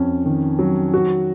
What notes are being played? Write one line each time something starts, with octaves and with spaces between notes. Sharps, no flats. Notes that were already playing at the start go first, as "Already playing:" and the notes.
Already playing: F2 C#4
D#3
F#3
F#4